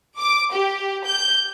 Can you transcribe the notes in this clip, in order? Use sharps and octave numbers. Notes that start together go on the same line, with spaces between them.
D6
G4
G6